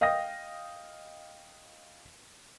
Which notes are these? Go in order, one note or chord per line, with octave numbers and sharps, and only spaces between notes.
D#5 F5 G5 D#6 A#6